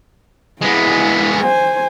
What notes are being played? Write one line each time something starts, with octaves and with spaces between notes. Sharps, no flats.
G#3 B3 E4
C5 G#5